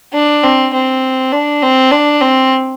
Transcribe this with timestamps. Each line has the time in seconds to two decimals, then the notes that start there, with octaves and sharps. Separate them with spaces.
0.13 D4
0.44 C4
0.73 C4
1.33 D4
1.62 C4
1.91 D4
2.20 C4